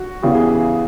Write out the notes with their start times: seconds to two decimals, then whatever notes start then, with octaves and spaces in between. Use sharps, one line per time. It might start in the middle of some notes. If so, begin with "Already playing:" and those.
Already playing: F#4
0.23 E2 C#3 E3 G3 B3 G4
0.35 G#4
0.48 G#4